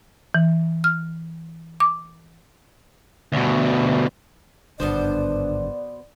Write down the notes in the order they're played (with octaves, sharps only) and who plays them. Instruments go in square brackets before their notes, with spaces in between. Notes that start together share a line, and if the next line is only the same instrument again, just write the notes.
[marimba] E3
F6
D6
[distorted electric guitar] D2 B2
[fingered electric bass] G#1 G2 D3 [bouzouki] B2 B3 C5 [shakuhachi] D4 [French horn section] D5